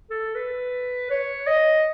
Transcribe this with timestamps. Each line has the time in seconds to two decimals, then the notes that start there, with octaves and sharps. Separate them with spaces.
0.10 A4
0.35 B4
1.10 C#5
1.47 D#5